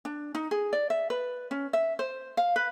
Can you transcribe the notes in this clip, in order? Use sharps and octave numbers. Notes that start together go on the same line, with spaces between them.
D4
D#4
G#4
D5
E5
B4
C#4
E5
C5
F5
B4